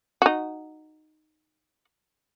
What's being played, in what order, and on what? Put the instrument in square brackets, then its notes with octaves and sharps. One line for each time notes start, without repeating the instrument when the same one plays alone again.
[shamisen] D#4 F#4